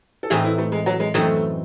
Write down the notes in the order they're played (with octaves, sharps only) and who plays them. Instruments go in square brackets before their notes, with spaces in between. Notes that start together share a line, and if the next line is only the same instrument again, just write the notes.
[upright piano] A4
[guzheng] A2 E3 C4 D#4 [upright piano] G#4
[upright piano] E4
A3
G#3
F#3
G#3
[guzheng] F#2 E3 C4 D#4 [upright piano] A3